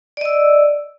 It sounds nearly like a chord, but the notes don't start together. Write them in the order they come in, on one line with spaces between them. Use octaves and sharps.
D5 D#5 E6